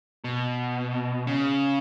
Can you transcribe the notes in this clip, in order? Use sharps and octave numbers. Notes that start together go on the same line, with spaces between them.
B2
C#3